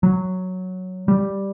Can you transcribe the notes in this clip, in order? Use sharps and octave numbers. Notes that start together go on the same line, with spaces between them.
F#3
G3